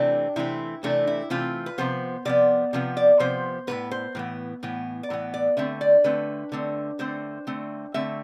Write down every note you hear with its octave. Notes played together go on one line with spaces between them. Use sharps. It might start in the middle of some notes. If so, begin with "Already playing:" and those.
Already playing: C3 E3 A3 C4 D4
C3 E3 A3 C4 E4
C3 E3 A3 C4 D4
E4
C3 E3 A3 C4 F4
B4
C3 F3 B3 C5
C3 F3 B3 D5
C3 F3 B3
D5
C3 F3 B3 C5
A2 E3 B3 B4
C5
A2 E3 B3
A2 E3 B3
D5
A2 E3 B3
D5
D3 A3 C4 E5
D5
D3 A3 C4 B4
D3 A3 C4
D3 A3 C4 C5
D3 A3 C4
D3 A3 C4 E5